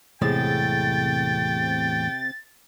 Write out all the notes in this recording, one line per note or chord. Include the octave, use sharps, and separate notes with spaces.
E2 A2 C3 G#3 G5 A6